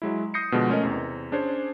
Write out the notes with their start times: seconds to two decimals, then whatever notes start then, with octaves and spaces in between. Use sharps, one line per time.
0.02 F#3 G#3 E4
0.34 D#6 G6 A#6 C7 C#7
0.52 B2 D3 F3 G#3 B3
0.69 A3 C#4 A#4 D#5
0.83 E2 C3
1.32 C#4 D4 G#4 C5 C#5